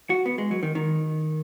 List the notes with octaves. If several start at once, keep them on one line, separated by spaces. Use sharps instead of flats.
F#4
B3
G#3
F#3
D#3
D#3